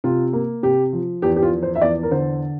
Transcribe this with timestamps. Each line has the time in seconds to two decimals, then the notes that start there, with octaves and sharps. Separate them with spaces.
0.04 C3 F4
0.33 A#3
0.63 C3 G4
0.93 F3
1.22 E2 G4
1.36 G4
1.42 F4
1.52 F3
1.63 C5
1.75 E5
1.81 E2 D5
2.03 A#4
2.11 D3 C5